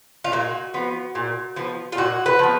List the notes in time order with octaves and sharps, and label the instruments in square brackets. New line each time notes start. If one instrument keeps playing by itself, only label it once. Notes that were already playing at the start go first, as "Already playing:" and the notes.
[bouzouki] F4
A#2 F#4
F3 B3
A#2
F3 B3
F4
A#2 F#4
B4
F3 B3